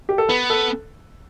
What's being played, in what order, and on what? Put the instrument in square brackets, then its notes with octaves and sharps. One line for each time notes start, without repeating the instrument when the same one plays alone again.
[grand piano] G4
A4
[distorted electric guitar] B3 [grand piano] B4
[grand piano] A4